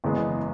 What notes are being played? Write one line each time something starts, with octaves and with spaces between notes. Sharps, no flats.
F#1 E2 C#3 G#3 B3